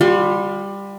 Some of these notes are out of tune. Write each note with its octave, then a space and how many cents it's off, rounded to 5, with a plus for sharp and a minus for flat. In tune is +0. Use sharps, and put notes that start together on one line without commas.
G3 +15 F#4 -45 C6 +0